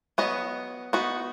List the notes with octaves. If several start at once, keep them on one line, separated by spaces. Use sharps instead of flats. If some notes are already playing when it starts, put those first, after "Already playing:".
F#3 B3 F#4 D#5
B3 D#4 F#4